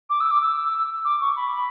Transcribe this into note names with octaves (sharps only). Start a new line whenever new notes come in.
D6
E6
D6
E6
D6
C#6
B5
B5